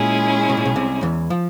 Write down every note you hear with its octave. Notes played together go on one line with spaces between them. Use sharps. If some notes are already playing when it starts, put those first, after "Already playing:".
Already playing: A#2 G#3 C#4 E4 G#4
B2
A#2
B1 B2
C2 C3
E2 E3
F3